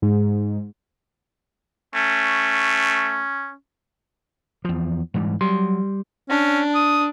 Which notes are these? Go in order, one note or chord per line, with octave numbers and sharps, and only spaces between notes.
G#2
A3 C#4
E2 F3
G#2 E3 G3
F#3 G3 C6
C#4 D4
D#6